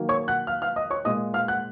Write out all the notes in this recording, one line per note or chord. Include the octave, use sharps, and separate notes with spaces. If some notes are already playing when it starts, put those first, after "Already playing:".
Already playing: D#3 F#3 A#3
C#5 C#6
F#5 F#6
F5 F6
F5 F6
D#5 D#6
C#5 C#6
A#2 G#3 D#5 D#6
F5 F6
F#5 F#6